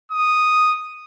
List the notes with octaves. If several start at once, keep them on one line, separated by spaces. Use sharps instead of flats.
D#6